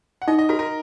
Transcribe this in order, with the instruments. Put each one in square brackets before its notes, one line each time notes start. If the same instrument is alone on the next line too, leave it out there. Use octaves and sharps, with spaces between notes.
[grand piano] F#5
[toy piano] D#4 [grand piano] D#5
[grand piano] D#5
[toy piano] F#4 [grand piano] A#4
[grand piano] A#4